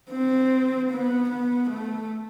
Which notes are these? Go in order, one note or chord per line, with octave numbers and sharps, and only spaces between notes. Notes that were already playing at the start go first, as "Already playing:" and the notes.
C4
B3
B3
A3